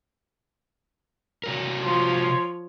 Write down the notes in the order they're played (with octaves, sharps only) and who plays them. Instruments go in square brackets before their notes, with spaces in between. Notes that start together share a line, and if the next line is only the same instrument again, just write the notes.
[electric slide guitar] C3 F#4 A#4
[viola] F3 C#5 [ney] C6